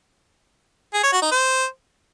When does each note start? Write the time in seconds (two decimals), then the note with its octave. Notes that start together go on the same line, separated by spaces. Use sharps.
0.93 G#4
1.03 C#5
1.12 F#4
1.22 D#4
1.31 C5